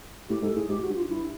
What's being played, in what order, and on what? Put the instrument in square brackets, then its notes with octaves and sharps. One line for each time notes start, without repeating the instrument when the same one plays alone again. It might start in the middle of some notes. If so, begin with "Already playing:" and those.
[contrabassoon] A2 [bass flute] G4
[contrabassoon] G#2 [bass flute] A4
[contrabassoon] A2 [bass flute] G#4
[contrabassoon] G#2 [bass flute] G4
[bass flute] F#4
[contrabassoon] G2
[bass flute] F4
D#4
[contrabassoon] G2 [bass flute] E4